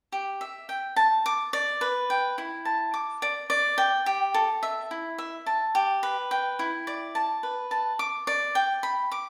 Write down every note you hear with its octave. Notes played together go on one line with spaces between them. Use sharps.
G4
E5
G5
A5
D6
D5
B4
G5
E4
A5
D6
D5
D5
G5
G4
A4
E5
E4
E5
A5
G4
B4
G5
E4
D5
A5
B4
A5
D6
D5
G5
B5
D6